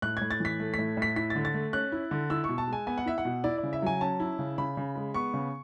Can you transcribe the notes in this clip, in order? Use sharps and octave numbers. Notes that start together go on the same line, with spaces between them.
A2 F#6
A2 G#6
A6
E3 B6
A3
A2 B6
A2
B6
E4 B6
D3 A6
A6
A3
C#4 F#6
E4
D3
E4 E6
B2 C#6
A5
G#3 G#5
B3 G#5
F#5
E4 E5
F#5
B2
E4 D5
D5
C#3
E5
F#3 G#5
C#4 A5
E4
C#3
C#3 B5
C#3
G#3
B3 C#6
C#3